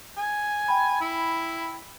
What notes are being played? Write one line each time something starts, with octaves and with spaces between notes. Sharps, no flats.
G#5
G5 B5
E4